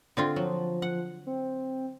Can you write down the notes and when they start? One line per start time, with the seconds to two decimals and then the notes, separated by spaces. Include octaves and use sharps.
0.17 D3 C4 F4
0.36 F3 F#3
0.82 F#5
1.27 C4